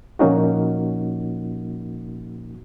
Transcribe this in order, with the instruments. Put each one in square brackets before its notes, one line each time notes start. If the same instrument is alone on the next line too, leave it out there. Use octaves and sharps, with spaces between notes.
[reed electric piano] A#2 F3 A#3 C#4 D#4 F#4